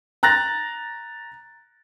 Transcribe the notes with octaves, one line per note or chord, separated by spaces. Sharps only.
A#5 F#6 A6 A#6